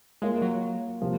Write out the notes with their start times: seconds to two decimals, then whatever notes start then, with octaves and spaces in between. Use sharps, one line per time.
0.22 G#3 A#3 F4 A#4 C#5
0.42 F#3
1.01 C3 F3 A#3